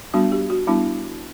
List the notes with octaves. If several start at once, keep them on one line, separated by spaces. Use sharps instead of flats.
G3 B3 D4 F#4
G4
F#4
G3 B3 D4 E4